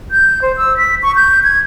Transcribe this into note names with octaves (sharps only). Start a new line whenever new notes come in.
G6
C5
E6
B6
C#6
G6
G#6